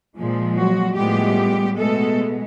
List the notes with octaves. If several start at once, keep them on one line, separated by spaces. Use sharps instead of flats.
A#2 F3 G#3
F#3 F#4
A2 F3 G3 G#3 B3 G4
B2 G#3 A3 B3 A4